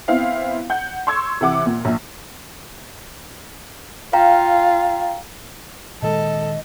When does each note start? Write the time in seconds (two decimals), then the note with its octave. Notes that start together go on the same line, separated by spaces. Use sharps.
0.08 B3 C4 E4 F5
0.70 F#5 G6
1.07 C6 C#6 E6 G#6
1.41 C3 E3 F#5 D6
1.66 A#2
1.85 A#1
4.13 F4 F5 G5 A#5
6.02 A#2 D#3 G#3 A4 D#5